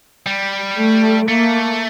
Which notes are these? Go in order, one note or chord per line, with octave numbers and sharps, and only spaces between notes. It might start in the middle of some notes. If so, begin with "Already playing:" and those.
G3
A3
A3 A#3